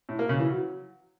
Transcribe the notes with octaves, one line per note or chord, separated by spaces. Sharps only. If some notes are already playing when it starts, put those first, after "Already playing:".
A2
A#3
C#3
E3
F#3